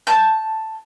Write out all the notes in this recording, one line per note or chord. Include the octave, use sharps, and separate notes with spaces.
A5 G6